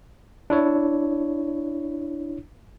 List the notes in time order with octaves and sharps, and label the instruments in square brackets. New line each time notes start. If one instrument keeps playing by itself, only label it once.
[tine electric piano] D4 E4 C#5